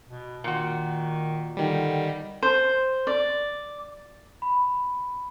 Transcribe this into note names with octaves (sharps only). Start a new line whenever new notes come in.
B2
A#2 D#3 F#4
D3 D#3 G3
C5
D5
B5